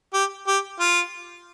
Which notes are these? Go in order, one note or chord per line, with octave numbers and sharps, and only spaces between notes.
G4
G4
F4